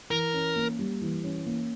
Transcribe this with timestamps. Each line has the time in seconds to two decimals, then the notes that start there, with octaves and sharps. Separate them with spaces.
0.11 E3 A#4
0.33 C#4
0.56 A#3
0.79 G3
1.01 E3
1.24 C#4
1.46 A#3